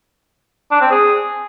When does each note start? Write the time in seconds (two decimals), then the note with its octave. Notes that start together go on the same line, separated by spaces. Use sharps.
0.71 D4
0.81 C4
0.91 G#4